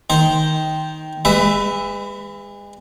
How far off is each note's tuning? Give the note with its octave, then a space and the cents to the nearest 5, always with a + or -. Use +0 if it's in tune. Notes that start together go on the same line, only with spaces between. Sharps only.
D#3 +5 C5 +0
G#3 -35 B4 +20 E5 +0